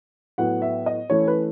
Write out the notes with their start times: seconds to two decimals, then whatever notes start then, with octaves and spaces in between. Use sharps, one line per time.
0.38 A2 F#3 B3 F#5
0.62 E5
0.86 D#5
1.10 E3 A3 C#4 C#5
1.28 B4